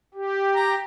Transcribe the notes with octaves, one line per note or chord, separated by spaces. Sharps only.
G4
A#5